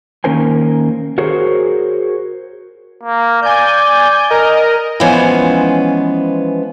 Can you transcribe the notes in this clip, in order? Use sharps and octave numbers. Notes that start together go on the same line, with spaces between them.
D#3 A#3 C#4 A#4 C5 G#5
F#4 G#4 A#4 C5 C#5
A#3
D5 G#5 G6
A#4 D#5
E3 F3 G#3 B3 C#4 C5